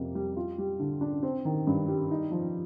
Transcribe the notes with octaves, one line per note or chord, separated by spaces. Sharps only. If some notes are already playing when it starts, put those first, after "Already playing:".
Already playing: F2 C3 A#3
G3
F4
G3
D3
D4
C4
D#3
G2
G3
D#4
F3